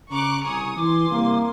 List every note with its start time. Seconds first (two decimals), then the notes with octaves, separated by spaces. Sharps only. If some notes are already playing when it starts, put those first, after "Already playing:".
0.11 C#3 A#5 C#6 D6 F#6
0.45 C2 G#5 C#6 D#6
0.76 E3 G#5 C6 D6
1.10 C2 A#3